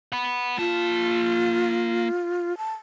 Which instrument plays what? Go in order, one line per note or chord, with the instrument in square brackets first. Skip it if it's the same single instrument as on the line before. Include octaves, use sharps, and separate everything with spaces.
[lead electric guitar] F#5 B5
[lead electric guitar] A#3 A5 [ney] F4
[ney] A5